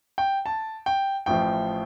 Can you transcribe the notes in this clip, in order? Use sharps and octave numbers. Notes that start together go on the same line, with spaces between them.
G5
A5
G5
A1 A2 F3 G5